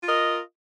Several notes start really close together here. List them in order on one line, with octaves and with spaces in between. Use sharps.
F4 A#4 D#5